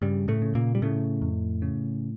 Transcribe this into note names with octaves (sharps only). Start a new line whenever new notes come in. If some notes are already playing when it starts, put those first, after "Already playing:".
G2 C#3 G3
A2 A3
C#3
A#2 A#3
G3
A2 C#3 A3
F2
C#3